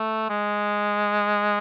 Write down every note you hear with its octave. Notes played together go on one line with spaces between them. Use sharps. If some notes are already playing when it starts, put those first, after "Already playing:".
Already playing: A3
G#3